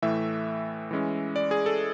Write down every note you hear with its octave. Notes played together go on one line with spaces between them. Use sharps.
A2 E3 A3 E5
E3 G#3 C#4
D5
G#4
A4